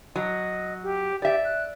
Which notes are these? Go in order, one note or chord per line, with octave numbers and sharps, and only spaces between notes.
F#3 D#5
G4
G4 D5 E5
F#6